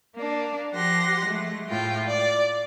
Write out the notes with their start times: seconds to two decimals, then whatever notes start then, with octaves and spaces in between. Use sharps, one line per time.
0.16 A#3 D4
0.74 F3 G4 F#5 C6 A#6
1.26 G#3 A3
1.69 A2 F4 G5
2.06 D5